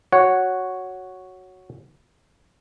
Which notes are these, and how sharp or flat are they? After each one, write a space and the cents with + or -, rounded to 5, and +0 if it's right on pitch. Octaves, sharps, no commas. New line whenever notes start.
F#4 +0 C#5 +0 F#5 +0